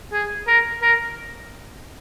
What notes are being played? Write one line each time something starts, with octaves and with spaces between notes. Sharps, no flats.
G#4
A#4
A#4